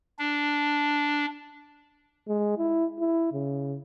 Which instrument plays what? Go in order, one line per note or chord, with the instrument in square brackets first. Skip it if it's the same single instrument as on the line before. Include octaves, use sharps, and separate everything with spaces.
[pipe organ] D4
[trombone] G#3
E4
E4
C#3